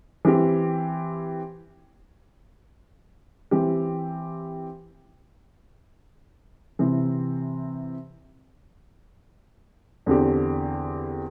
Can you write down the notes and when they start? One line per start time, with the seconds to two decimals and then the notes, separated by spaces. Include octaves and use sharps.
0.25 E3 C4 G4
3.51 E3 C4 G4
6.79 C3 E3 C4
10.06 E2 D3 C4 G4